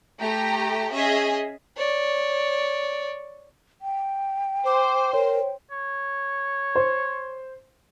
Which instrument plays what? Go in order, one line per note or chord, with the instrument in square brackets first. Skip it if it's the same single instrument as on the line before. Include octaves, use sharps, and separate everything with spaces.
[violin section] A3 G4 G5 A#5
C#4 G#4 D#5 E5
[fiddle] C#5 D5
[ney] G5
[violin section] C5 [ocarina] D6
[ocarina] A#4 [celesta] C#5
[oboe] C#5
[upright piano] C5